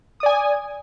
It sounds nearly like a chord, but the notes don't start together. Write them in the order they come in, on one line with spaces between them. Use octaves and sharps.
D#6 D5 G#5